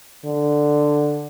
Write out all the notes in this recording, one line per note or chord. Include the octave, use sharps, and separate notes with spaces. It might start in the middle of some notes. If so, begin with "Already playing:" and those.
D3